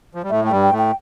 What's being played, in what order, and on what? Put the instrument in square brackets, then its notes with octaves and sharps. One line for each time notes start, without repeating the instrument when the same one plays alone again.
[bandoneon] F3
G3
[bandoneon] A2 A3 [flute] E5
[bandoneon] A3 [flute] G5
[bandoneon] G2 G3
[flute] G5
[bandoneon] A2 A3
[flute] G5